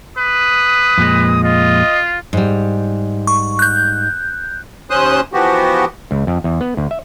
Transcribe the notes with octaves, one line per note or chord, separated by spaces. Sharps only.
B4 D#6
F2 A#2 G#3
F4 D#5
G#2 G3
C#6
F#6 G6
D#2 C#4 C5 C6 D#6 F#6
E3 F3 B3 F#4 G4
C#2
F2
E2
B3
D2
E5